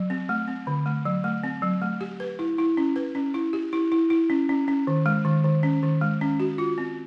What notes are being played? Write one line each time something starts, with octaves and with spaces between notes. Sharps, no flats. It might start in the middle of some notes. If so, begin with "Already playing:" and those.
Already playing: F#3
C4
A3
C4
D3
A3
F#3
A3
C4
F#3
A3
G4
B4
E4
E4
C#4
B4
C#4
E4
G4
E4
E4
E4
C#4
C#4
C#4
D#3
G#3
D#3
D#3
C#4
D#3
G#3
C#4
F#4
F4
C4